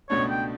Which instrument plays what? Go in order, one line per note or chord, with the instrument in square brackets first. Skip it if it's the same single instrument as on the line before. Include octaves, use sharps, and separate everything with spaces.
[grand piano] C#2 B2 A3 D4 [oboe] C#5
[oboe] G5